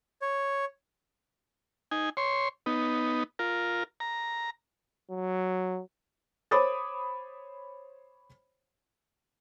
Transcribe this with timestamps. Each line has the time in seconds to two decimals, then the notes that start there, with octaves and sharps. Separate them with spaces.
0.22 C#5
1.91 D#4 G#5
2.17 C#5 C6
2.66 B3 D#4
3.39 F4 A#4
4.00 A#5
5.11 F#3
6.51 C5 C#5 B5 D6 D#6 A6